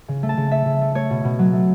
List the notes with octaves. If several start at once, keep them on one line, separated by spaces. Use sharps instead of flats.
C#3
A3
A5
C#3
A3 E5
C#3
A3
A3 C#5
B2
B2
F#3
A3